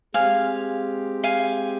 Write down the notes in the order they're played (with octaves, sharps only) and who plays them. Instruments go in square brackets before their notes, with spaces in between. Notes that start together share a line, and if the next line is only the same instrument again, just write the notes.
[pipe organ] G#3 C4 G4 [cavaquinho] F5 G#5
[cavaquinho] F5 G#5